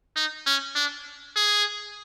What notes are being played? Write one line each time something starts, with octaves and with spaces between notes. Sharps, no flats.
D#4
C#4
D4
G#4